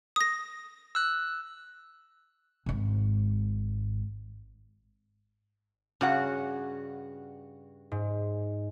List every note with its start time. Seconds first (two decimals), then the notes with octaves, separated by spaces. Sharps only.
0.16 D#6 A#6
0.95 E6 F#6
2.66 G#1 G#2
6.01 G2 C#3 F#4 F#5
7.92 G#2